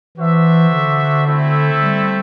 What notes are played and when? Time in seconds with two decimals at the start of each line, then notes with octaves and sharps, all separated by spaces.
0.17 E3 D4 F#4 C5 E5
0.72 D3
1.26 A3 C4 E4 A4 E5
1.82 G3